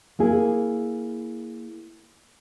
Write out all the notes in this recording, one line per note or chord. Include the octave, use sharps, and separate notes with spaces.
A#3 E4 G#4